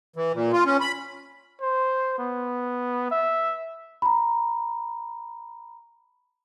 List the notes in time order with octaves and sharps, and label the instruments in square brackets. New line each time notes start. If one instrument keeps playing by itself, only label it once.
[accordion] E3
A#2
F4
C#4
B5
[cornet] C5
B3
E5
[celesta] A#5 B5